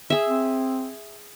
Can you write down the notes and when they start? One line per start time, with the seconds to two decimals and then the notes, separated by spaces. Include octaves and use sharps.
0.10 G#4 E5
0.28 C4